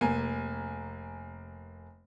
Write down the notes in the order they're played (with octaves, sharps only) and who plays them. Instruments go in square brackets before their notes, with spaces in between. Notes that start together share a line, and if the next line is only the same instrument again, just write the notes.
[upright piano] F1 A#3 G#5